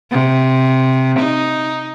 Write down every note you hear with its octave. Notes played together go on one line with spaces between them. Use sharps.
C3
D#4